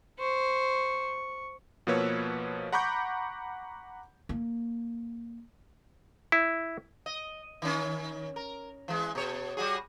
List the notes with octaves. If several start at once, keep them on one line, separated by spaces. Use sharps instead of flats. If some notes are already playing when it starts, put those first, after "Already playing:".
C5 C#6
B2 F3 A#3 B4 C#5 E6
F#5 A#5 B5 C#6 D6 G6
A#3
E4
D#5
D#3 C#4
A#4
E3 G#3
B2 C#5
G3 F#4 G#4